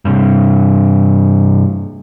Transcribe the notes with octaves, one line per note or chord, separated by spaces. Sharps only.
G2 C3